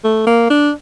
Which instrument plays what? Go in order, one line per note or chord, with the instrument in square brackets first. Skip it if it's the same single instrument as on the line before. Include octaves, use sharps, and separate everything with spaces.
[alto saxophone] A3
A#3
D4